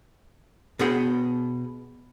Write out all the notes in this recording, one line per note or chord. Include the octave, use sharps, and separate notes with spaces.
B2 B3 G#4 F#5 G5